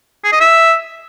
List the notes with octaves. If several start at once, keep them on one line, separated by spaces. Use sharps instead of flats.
G#4
D#5
E5